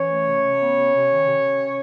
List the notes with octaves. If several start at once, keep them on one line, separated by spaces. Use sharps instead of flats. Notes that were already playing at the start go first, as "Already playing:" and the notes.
Already playing: E3 C#4 C#5
A3
C3
C3
B3
C3
C3
D#3
C3
C3